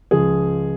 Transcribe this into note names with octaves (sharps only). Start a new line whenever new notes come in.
C#2 C#3 F3 G#4